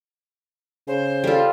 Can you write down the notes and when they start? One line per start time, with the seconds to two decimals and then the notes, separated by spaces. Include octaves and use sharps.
0.88 C#3 C5
1.24 G3 F4 A4